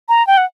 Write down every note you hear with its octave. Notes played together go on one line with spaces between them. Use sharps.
A#5
G5
F#5